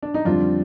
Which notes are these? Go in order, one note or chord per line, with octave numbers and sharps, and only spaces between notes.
D4
D#4
F2 D3 G3 C4 D4 F4